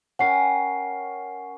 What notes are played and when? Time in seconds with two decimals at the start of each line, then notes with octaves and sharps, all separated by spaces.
0.19 C#4 A#4 F#5 G5 C7